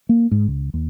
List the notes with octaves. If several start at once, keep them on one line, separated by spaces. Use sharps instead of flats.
A#3
G#2
C#2
D#2